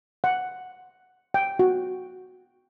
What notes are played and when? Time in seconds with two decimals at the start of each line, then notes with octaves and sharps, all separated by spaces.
0.24 F#5
1.34 G5
1.59 F#4